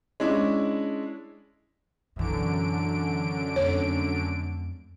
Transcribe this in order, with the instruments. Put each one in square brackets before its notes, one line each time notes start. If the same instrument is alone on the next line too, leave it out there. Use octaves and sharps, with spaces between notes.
[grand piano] G#3 C#4 D4 E4
[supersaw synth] F#2 D3 D7 [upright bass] B2 E3
[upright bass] F2 A3 [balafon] C#5